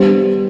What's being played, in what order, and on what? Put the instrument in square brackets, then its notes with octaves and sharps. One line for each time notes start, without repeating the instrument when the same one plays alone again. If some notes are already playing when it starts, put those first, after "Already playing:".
Already playing: [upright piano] G3 B3 D4 G4 C5